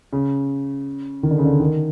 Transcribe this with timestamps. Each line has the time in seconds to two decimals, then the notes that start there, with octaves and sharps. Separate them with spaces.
0.13 C#3
1.23 D#3
1.31 D3
1.38 C#3
1.45 D3
1.60 D#3